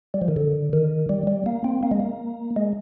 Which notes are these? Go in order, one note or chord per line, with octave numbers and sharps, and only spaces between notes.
G3
F3
D#3
D3
D#3
G3
G3
A#3
C4
A#3
G#3
A#3
G#3